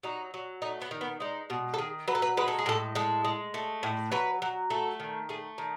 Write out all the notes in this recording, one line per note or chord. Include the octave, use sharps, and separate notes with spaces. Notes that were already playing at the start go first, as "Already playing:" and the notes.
F#3 D#4
F#3
A3 D#4
B3
D#3
B3
G#3 D#4
B2
A4
D#3 G#4
F#3 B4
A4
B4
G#3 B4
A4
G#4
A2 A4
G#3 A4
G#3
A3
A2
F#3 B4
F#3
A3 A4
D#3
A3 G#4
D#3